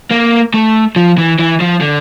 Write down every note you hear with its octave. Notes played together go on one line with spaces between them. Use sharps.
A#3
A3
F3
E3
E3
F3
D3